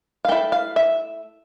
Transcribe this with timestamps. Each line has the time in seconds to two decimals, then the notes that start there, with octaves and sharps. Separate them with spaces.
0.25 F5
0.28 A3 E4 G5
0.52 F5
0.76 E5